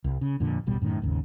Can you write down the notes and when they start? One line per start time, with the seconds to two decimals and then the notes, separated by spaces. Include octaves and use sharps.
0.04 C2
0.21 C#3
0.40 F2 A#2 D3
0.66 E1 A1 B2 G3
0.81 F#2 A2 D#3
1.02 G#1 D#2 C#3